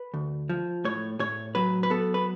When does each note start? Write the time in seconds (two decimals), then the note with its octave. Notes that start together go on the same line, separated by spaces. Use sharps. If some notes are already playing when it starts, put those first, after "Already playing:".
Already playing: B4
0.14 D2
0.49 F3
0.85 A2 C#5
1.19 A2 C#5
1.55 F#3 B4
1.83 B4
1.90 B3 A4
2.14 B4